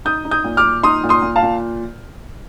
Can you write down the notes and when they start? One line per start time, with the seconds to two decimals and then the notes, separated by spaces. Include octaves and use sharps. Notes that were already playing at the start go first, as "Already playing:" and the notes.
0.05 D#4 D#6 G6
0.25 D#4
0.31 D#6 G6
0.44 A#2
0.57 D6 F6
0.64 A#2
0.83 D#4 C6 D#6
1.04 A#2
1.09 C6 D#6
1.22 A#2
1.36 F5 A5
1.43 A#2